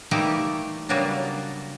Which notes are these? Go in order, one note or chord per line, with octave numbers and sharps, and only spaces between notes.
E3 G3 A3 A#3 D#4 G4
C#3 F#3 G3 A#3 B3 D4